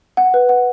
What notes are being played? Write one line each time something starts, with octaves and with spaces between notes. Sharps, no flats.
F#5
B4
F#5